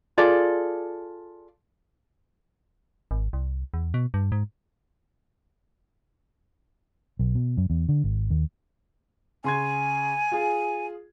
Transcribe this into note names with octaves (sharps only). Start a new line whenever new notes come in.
F4 G#4 A4 D5
G#1
C2
E2
B2
G2
G#2
B1
B2
F#2
E2
D3
G#1
D#2
C#3 G#5 C6 G#6
F4 G#4